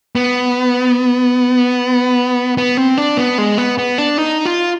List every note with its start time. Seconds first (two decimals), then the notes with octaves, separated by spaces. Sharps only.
0.16 B3
2.57 B3
2.77 C4
2.98 D4
3.17 B3
3.38 G#3
3.58 B3
3.78 B3
3.98 D4
4.18 D#4
4.45 F4